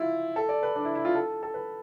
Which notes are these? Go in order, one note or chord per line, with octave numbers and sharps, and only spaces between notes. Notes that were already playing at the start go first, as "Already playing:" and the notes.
Already playing: E4 F4
A4
D5
B4
D4
E4
E4
F4
A4
A4
B4